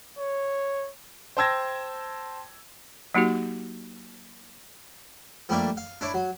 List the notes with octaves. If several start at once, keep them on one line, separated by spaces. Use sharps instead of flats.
C#5
C5 G5 A5 E6 G#6 A#6
F#3 A#3 D#4 F#4 G4
F3 G3 A3 A#3 D4
F5
D4 E4 C#5 D5
F#3